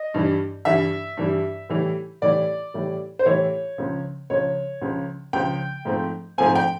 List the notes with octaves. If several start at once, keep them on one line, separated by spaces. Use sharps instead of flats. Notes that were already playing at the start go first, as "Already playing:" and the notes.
Already playing: D#5
G2 E3 G3
G2 E3 G3 E5
G2 E3 G3
A2 E3 G3
A2 E3 G3 D5
A2 E3 G3
C5
A2 E3 G3 C#5
C#2 C#3 F3
C#2 C#3 F3 C#5
C#2 C#3 F3
C#2 C#3 F3 G5
G#2 F3 A3 C4
G#2 F3 A3 C4 G#5
G5